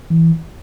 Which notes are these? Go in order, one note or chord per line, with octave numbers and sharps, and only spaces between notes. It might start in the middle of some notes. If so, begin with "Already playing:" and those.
E3